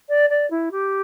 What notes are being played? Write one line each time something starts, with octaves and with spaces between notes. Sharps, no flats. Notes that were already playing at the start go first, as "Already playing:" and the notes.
D5
D5
E4
G4